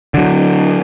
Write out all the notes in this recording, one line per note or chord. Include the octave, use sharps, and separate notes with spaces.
D3 F#3